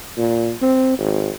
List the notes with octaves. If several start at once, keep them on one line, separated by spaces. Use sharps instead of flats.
A#2
C4
G#1